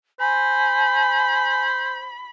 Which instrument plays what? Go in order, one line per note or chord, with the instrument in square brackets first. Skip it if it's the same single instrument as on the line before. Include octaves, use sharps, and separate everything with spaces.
[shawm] C5 [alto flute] G#5 [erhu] B5